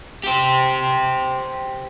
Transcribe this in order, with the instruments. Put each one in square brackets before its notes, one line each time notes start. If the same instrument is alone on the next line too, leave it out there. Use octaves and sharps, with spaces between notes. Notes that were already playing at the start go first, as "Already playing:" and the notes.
[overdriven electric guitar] G4 C5